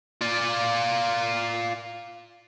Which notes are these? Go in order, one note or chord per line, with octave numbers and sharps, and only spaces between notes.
F4 D5